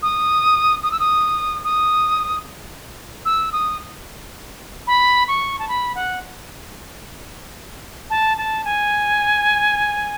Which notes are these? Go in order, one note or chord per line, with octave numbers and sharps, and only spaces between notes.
D#6
D#6
E6
D#6
D#6
E6
D#6
B5
C#6
A5
B5
F#5
A5
A5
G#5